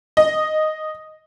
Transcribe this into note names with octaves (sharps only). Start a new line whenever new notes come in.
D#5